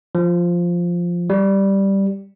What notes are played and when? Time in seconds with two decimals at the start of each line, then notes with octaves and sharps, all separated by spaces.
0.15 F3
1.30 G3